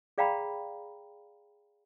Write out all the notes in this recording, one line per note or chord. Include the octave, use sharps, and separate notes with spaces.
G#4 D5 F5 G5 A#5 B5